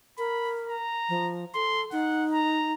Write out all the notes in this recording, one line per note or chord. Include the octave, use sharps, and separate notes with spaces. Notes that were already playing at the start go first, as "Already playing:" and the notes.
A#4 B5
A#5
F3
A4 C6
D#4 F#5
A#5